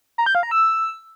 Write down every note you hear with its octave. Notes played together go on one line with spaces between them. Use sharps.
A#5
G6
F5
A#5
E6